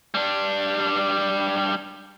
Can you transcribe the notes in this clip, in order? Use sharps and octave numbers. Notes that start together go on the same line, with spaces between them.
G3 D4